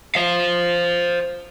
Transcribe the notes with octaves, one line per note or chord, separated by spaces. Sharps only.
C5 F5